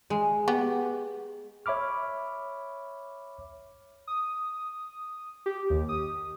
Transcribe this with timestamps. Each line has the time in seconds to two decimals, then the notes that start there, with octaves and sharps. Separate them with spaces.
0.10 G#3
0.48 B3 G4
1.66 C#5 E5 B5 D6 F6
4.07 D#6
5.46 G4
5.70 D#2
5.89 D#6